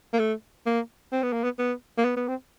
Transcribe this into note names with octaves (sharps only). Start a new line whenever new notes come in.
A#3
A3
A#3
C4
B3
A#3
B3
B3
A#3
B3
B3
C4